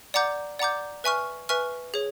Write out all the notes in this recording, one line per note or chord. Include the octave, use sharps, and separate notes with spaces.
D5 F#5 A#5 D6 G6
D5 F#5 A#5 D6 G6
B4 E5 G#5 C#6 F6
B4 E5 G#5 C#6 F6
G#4 C#5